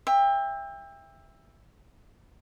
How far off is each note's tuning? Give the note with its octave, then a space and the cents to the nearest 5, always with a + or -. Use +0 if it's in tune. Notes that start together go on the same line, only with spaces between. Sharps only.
E5 +0 G5 +30